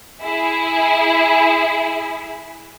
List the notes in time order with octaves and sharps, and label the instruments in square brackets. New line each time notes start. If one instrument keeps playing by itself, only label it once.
[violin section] E4 G#4